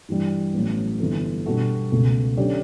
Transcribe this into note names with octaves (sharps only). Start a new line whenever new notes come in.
G2 E3 G3
A1 A2 F#3 B3
G1 G2 E3 A3
B2 G3 D4 F#4 A4
C#2 B2 A3
D3 F#3 C#4 G4 D5